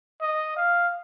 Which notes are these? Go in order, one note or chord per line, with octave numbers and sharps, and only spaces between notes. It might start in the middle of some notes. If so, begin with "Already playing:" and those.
D#5
F5